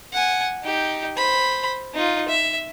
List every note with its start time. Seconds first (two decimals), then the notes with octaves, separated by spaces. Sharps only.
0.13 F#5 G#5
0.63 D#4 G4
1.17 C5 B5
1.94 D#4 F4
2.28 E5